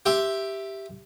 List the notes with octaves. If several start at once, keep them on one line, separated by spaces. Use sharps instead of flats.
G4 E5 C6